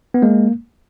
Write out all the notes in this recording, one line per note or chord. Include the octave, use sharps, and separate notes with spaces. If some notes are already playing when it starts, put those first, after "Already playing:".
B3
G#3 A#3